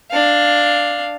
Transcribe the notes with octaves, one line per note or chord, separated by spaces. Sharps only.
D4 F5